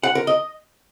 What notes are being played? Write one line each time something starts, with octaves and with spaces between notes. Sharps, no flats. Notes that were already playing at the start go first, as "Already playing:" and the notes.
F#5
A#4
D#5